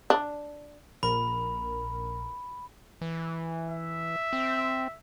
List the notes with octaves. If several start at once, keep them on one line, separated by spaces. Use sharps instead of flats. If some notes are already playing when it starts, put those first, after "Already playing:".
D4
A#1 A#4 B5
E3
E5
C4